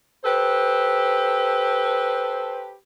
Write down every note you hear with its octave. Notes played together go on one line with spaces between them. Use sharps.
G4 A4 B4 C5